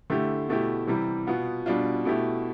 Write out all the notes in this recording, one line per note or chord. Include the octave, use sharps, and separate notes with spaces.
D3 A3 E4 G4
B2 A3 E4 G4
C3 E3 G3
B2 B3 F4
B2 G3 D4 F4
B2 A3 E4 G4